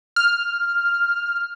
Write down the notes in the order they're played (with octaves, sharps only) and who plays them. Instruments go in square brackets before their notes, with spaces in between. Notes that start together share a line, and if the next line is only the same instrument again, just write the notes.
[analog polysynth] F6